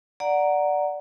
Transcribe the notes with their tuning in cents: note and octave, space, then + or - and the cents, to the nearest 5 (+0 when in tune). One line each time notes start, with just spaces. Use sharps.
D5 +0 F#5 +0 A#5 +0